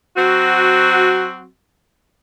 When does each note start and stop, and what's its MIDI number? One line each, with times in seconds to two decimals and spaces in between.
0.17 1.47 54
0.17 1.47 60
0.17 1.47 66